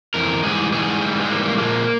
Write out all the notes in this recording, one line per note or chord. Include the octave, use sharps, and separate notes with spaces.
F2 E3 A#4
G#2 E3 G3 G#4
G#2 E3 G3 G#4
G#2 E3 G3
G#3
G#2 E3 G3 A#3
A#3
A#2 F3 G#3 A#3